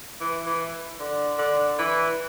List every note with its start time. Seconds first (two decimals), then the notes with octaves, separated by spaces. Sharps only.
0.20 E3
0.46 E3
1.00 D3
1.38 D3
1.79 E3